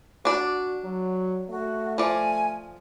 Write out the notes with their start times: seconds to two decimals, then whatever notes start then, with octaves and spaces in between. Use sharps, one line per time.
0.25 D4 F#4 D5
0.84 F#3
1.50 A3 F#4
1.98 F3 D5 G#5